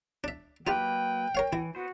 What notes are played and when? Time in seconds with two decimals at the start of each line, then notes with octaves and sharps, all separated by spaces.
0.24 D4 E5
0.67 F#3 A#3 D#4 F4 G4 B4 G5
1.35 A#4 C#5 F5
1.53 E3 E4
1.75 B3 F#4 C5